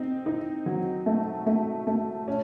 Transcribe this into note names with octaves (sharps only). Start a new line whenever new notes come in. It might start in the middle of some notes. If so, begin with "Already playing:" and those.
Already playing: C4 D#4
D#4
F#3
A3
A3
A3
C#4